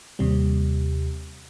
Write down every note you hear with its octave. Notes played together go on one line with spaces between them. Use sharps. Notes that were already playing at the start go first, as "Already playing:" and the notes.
D#2 C3 G3